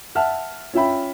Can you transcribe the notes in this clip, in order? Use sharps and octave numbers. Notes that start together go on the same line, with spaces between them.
E5 F#5 A5 F6
C#4 F4 E5 G5 B5